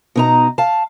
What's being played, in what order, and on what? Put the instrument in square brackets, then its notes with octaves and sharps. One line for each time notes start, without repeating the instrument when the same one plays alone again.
[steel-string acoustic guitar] B2 D#4 A#5
F5 A5